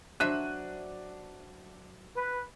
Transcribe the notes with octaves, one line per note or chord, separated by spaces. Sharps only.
F#3 D4 C5 E5 F#6 D#7
B4